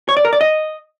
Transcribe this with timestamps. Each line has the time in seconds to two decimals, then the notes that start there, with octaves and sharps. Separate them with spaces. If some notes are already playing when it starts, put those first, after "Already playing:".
0.09 C#5
0.17 D5
0.25 A#4
0.33 D5
0.41 D#5